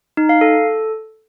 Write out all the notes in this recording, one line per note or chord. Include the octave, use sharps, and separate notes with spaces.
D#4
F5
A4